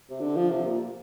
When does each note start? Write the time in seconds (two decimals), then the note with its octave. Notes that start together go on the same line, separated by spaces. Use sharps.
0.10 C3
0.20 D3
0.36 F3
0.50 C3
0.66 A#2